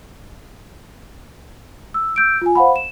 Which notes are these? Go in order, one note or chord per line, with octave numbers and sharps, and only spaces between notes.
E6
E6 G6 D7
F4 G#5
C5 F5 F#5 B5
E7